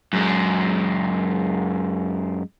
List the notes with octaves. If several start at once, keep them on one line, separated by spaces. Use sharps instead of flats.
F#2 G#3